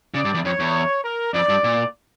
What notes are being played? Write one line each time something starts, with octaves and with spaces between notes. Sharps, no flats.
C#3 D5
G2
E2
F2 C#5
E2
A#4
F2 D5
G2
A#2